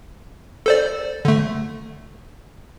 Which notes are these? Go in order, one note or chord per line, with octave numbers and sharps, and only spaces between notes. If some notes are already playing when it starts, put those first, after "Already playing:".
A4 C5 D5
D3 A3